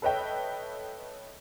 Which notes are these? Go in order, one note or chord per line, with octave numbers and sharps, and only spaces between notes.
A4 B4 C#5 D#5 E5 G5